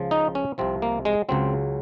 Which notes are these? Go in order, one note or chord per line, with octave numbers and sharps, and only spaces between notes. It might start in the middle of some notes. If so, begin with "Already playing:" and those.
Already playing: C#2 C#3 F3
D#4
C#4
C2 C3 F3 C4
A#3
G#3
C#2 C#3 F#3 C4